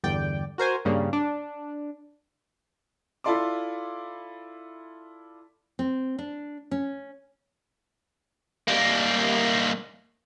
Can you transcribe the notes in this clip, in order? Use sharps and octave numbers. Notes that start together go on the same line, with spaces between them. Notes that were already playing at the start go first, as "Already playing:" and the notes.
G1 E2 D5 G5
F#4 A#4 C5 G#5
G2 C#3 G3 A#3
D4
E4 F4 A4 D5 C6 D6
C4
D4
C#4
G3 A#3